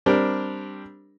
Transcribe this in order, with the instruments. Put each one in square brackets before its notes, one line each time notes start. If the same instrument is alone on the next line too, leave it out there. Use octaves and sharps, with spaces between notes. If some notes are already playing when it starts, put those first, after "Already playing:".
[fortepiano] G3 C4 D4 G4 A#4